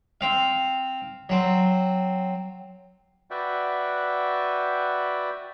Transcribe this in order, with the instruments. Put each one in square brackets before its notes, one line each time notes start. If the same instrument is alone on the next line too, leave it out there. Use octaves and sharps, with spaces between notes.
[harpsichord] C4 F5
F#3 C4
[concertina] F#4 B4 D5 E5 F#5 G5